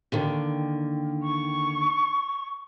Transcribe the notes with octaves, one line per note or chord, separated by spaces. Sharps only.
D#2 D3 D#3
C#6